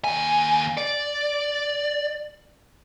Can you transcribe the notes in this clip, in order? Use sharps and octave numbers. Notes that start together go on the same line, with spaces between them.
D#2 G#5
D5